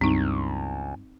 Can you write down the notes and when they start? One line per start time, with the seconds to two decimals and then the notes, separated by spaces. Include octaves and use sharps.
0.01 C#2 G2 C4 D#4